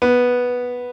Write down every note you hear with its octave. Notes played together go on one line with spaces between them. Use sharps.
B3